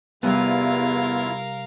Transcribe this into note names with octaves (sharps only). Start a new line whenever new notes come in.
E2 C3 G3 B3 E4 F4 A#4 F5